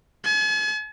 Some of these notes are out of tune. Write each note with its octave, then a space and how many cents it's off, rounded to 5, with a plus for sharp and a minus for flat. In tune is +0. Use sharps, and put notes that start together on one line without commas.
G#5 +45